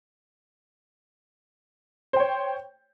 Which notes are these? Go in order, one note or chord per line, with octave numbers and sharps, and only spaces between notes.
C5 C#5 G5